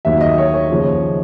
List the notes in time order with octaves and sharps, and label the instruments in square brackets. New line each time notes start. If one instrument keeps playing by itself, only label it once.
[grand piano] D#2 D#3 F#3 E5
D#5
C#5
C#5
D#2 C#3 F3